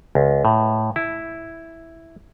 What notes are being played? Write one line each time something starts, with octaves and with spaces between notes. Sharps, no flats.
C#2
A2
E4